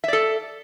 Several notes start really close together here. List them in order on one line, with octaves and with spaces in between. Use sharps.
E5 D5 A4